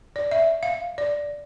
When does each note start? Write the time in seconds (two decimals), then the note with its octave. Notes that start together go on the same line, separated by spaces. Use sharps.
0.16 D5
0.31 E5
0.63 F5
0.98 D5